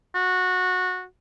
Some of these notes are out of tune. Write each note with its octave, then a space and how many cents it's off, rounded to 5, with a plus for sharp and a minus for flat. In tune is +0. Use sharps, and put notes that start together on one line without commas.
F#4 -15